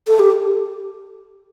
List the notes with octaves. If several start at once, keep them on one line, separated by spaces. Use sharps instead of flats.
A4
G4